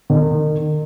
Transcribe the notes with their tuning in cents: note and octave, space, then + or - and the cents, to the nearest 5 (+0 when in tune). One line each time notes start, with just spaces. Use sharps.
D#3 -35